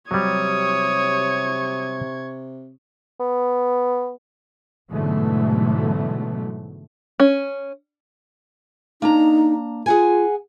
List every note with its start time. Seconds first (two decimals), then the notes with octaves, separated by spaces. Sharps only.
0.11 C3 F#3 G3 C#5 C#6 D#6 G#6
3.20 B3
4.90 G#2 B2 D3 E3 F#3 A3
7.20 C#4
9.02 A#3 D4 D#4 A#5
9.86 F4 G#4 F#5 G#5